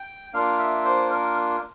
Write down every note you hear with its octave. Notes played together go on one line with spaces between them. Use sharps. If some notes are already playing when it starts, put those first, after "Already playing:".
Already playing: G5
A#3 D4 F4 F5
E5
C5
A#4